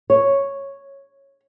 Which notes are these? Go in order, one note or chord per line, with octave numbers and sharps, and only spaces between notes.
C#5